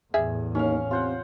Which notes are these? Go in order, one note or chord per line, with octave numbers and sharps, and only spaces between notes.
E2 A2 G3 G#4 E5
D#2 C#4 F5
C3 F4 C5 F#5